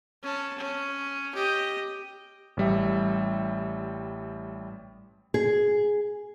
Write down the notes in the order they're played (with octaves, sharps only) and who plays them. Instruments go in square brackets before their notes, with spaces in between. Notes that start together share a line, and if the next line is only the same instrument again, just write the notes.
[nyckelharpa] C#4 A5
C#4
G4 D#5
[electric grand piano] A1 G3 E5
[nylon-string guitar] G#4